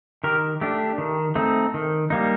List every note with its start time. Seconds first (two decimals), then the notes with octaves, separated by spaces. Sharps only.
0.24 D#3 G4 A#4
0.61 A3 D4 G4
0.98 D#3
1.35 A3 C4 D#4
1.74 D#3
2.10 G3 A#3 D#4